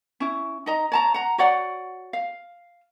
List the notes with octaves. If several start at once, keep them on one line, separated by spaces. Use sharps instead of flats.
C#4 E4
D#4 D#5 A#5
C#5 A5 A#5
F#5 A#5
F#4 C#5 D5 F#5
F5